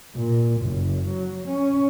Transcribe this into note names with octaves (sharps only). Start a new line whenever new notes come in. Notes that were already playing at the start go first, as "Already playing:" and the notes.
A#2
F#1
F#3
C#4